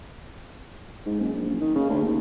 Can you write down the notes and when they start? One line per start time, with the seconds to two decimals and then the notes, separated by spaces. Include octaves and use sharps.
1.06 G#2
1.20 F#1
1.34 A#1
1.49 F#1
1.61 D#3
1.75 C#3
1.89 D2
2.01 D#2